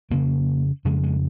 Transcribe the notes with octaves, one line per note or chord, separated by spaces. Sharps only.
F2 C#3 A#3
F2 C#3 G#3
G#3